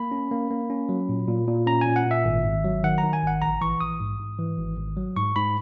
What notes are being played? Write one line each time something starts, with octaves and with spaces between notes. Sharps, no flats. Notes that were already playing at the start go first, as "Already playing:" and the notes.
Already playing: A#3 B5
C#4
A#3
A#3
C#4
F#3
A#2
A#2
A#2
C#4 A#5
A#2 G#5
F#5
A#2
E5
G#1
G#1
F#3
D#3 F#5
D#3 A#5
G#5
G#1 F#5
A#1 A#5
E3 C#6
A#1 D#6
G#2
G#2
E3
G#1
G#1
F#3
G#2 C#6
G#2 B5